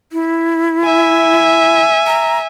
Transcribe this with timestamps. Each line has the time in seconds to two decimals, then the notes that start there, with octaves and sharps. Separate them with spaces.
0.13 E4
0.84 E5 G#5
2.07 A#5